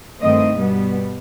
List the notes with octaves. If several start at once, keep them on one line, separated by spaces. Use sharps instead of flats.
G2 D#3 A3 C4 D#5
B2 G3 B3